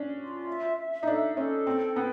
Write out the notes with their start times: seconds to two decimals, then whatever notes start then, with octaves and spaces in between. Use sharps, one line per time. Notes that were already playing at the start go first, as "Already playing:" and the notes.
Already playing: C#4 D4
0.18 F4
0.47 E5
0.77 E5
1.03 D#4
1.07 D4 A4
1.37 C#4 A4
1.67 C4 G5
1.96 B3 G5